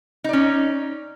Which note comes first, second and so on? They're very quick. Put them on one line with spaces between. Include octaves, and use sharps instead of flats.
D#4 D5 C#4